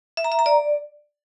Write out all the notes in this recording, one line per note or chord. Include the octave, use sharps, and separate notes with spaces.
E5
A#5
E5
A#5
D5